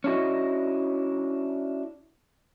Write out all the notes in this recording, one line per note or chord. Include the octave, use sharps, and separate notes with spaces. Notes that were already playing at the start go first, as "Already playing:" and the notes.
C#4 D4 E4 F#4 D#5